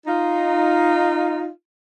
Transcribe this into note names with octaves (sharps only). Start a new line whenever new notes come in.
D#4 F4